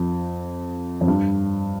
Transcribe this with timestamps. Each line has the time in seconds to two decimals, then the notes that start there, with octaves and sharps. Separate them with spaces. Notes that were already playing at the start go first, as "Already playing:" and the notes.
Already playing: F2
1.01 F2
1.08 G2